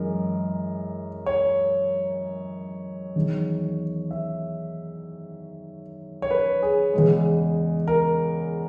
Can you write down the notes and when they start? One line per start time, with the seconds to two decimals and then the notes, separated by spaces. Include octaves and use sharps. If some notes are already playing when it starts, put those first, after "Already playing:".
Already playing: F#2 E3 G#3 A#4
1.26 C#5
3.16 E2 D#3 F#3
4.11 E5
6.22 C#5
6.31 B4
6.62 G#4
6.93 E2 C#3 G#3
7.88 A#4